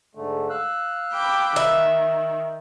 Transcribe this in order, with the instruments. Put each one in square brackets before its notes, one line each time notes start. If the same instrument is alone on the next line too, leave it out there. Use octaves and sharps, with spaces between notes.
[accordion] G#2 D3 A3
F5 E6 F#6
[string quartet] G5 B5 D6
[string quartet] D#3 [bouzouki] E5